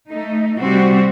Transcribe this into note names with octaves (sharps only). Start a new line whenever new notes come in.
A3 D#4
C3 G3 C4 F#4